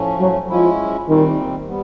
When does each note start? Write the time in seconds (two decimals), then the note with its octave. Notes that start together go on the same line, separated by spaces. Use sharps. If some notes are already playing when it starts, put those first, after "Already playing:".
Already playing: A2 F3 A3 C#4
0.20 F#3
0.49 F3 G#3 C#4 E4
1.08 A#2 D#3 G3 C4
1.67 G3 B3